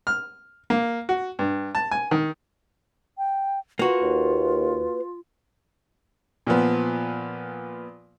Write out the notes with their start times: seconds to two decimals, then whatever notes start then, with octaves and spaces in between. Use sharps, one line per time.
0.07 F6
0.70 A#3
1.09 F#4
1.39 G2
1.75 A5
1.91 G#5
2.11 D#3
3.18 G5
3.79 A#3 F4 F#4 B4
4.02 D#2
6.47 A#2 F3 B3